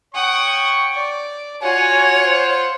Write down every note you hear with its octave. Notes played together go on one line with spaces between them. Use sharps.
C#5 F#5 G5 C#6 D#6
D5
F4 F#4 C#5 F#5 G#5
C5